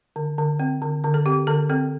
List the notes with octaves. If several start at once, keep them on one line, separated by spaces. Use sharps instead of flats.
D3
D3
C4
D3
D3
A4
C4 G4
D3 A4
C4 A4